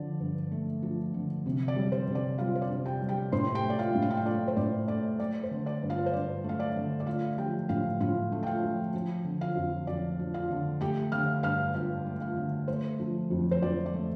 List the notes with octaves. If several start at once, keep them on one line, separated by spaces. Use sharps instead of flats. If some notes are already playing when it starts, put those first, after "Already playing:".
Already playing: D3 F3 D5
G2
A3
F3
D3
C3
D5
G3
C5
C3
D5
G3 F4 F5
C5
D5
C3
G4 G5
G3
G4 G5
A2 C5 C6
G4 G5
A3
D5
F4 F5
A2
F5
G5
F4 F5
A3 D5
C5
A2 D5
A3 D5
A3 D5
C5
D3
D5
G2
F4 F5
C5
G2 D5
A3 F5
D5
D3
D5
A3 F4 F5
F3 G4 G5
A2 F4 F5
A2 F4 F5
A3
G5
F4 F5
F3
F3
D3
F4 F5
F2
F2 D5
F3
F4 F5
D3
A3 G4 G5
D3 F5 F6
G2 F5 F6
G2 F4 F5
A3
F4 F5
D3
A3 C5
F3
F2
C5
F2 D5
D5
A3